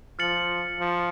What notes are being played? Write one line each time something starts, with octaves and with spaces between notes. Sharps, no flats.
F3 F6 A6 C#7 F#7
F3